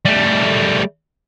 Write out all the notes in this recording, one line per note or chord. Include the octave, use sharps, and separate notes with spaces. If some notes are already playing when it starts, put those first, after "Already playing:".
G3 A3